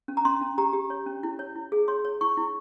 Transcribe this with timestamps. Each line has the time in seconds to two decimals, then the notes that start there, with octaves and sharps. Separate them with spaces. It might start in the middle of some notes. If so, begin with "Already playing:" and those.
0.08 C#4
0.17 A#5
0.25 C#4 C6
0.41 C#4
0.58 G4 A#5
0.73 G4
0.90 C#5
1.06 C#4
1.23 E4
1.39 C#5
1.56 E4
1.72 G#4
1.88 C#5 C6
2.05 C#5
2.21 E4 C#6
2.37 E4